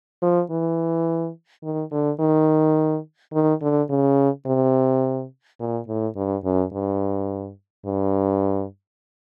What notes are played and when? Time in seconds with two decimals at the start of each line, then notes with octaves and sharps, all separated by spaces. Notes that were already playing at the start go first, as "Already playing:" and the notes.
0.22 F3
0.50 E3
1.63 D#3
1.91 D3
2.20 D#3
3.33 D#3
3.62 D3
3.89 C#3
4.46 C3
5.60 A#2
5.88 A2
6.16 G2
6.44 F#2
6.72 G2
7.86 G2